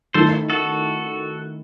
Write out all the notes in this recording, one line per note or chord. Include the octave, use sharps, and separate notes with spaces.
D#3 A3 E4 A4 C5
F#4 A4